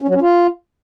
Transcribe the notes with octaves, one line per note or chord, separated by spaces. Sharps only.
C#4
F#3
C#4
F4